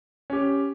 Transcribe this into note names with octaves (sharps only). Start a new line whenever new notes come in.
C#4 G4